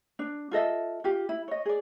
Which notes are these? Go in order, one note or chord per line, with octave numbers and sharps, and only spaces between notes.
D4
F4 A4 D#5 E5
F4 G4
E4
C#5 D#5
G#4 D5